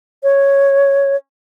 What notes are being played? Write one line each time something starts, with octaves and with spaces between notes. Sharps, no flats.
C#5